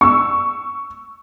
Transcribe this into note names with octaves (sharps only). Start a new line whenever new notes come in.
C#6 E6